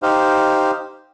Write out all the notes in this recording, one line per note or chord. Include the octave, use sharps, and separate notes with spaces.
D#4 G4 C5 F5